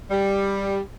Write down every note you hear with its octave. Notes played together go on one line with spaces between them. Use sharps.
G3